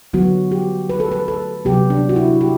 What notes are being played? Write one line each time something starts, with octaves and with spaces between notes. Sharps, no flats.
D3 F#3 B3 F#4
G4
B4
A4
B4
A4
C3 F#3 B3 G4
D4
F#4
E4
G4